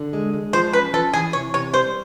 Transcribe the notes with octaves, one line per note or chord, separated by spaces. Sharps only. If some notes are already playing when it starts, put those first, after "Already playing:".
Already playing: D3
G#3
G#3
F3 C5
C#4 B4
F3 A4
E3 G#4
C3 C#5
C3 C#5
G3 C5